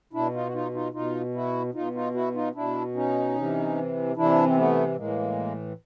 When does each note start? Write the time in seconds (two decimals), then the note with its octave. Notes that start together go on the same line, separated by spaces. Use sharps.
0.13 B2 D4 E4
0.33 D#4 F4
0.47 F#4
0.54 D#4 F4
0.74 D#4 F4
0.94 B2 D#4 F4
1.34 E4 F#4
1.74 B2 D#4 F4
1.95 D#4 F4
2.14 E4 F#4
2.35 D#4 F4
2.55 B2 D4 E4
2.95 C#4 D#4
3.35 C3 E3
4.16 C3 E3 D4 E4
4.45 C4
4.56 A3 B3
4.96 A2 E3 G#3 A#3